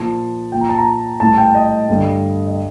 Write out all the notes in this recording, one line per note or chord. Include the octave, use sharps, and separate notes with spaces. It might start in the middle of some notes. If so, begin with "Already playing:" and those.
Already playing: A#2 F3 A5
A#2 F3 G5
A#5
A5
A#5
A2 G3 A5
G5
D#5
G2 D3 G3
D#5